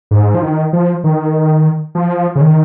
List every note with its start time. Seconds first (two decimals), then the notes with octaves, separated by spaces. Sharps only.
0.11 G#2
0.34 F3
0.42 D#3
0.73 F3
1.04 D#3
1.95 F3
2.35 C#3
2.41 D#3